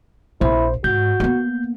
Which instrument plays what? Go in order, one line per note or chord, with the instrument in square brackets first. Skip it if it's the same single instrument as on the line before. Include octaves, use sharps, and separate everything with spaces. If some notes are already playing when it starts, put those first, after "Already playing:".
[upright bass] A#1 [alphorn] E4 [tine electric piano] C5
[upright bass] G#2 [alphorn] F#4 [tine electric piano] G6
[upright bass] A#3 B3